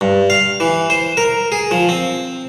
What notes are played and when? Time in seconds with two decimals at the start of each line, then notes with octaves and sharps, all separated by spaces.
0.01 G2
0.30 F5
0.60 E3
0.90 C5
1.17 A#4
1.52 G#4
1.71 F3
1.89 C4